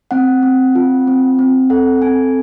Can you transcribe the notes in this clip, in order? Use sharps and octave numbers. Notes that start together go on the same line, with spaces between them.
C4 F#5
C4
F4
C4
C4
A4 F#5
C4 G#5